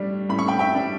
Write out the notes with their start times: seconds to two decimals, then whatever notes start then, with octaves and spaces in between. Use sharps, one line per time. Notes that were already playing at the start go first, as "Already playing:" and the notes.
Already playing: A2 G3 D4
0.29 A2 B5
0.39 C#6
0.48 G5 B5
0.59 E5 G5
0.75 G3 D4